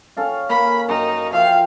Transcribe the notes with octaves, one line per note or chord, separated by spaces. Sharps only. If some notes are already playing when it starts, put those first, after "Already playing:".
C#4 A4 F5
A#3 B5
F#2 D#4 A#5
F3 E5 F5 G5